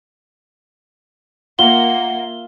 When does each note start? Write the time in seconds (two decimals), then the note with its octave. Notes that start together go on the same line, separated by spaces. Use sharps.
1.59 A#3 F4 E5 F#5 G7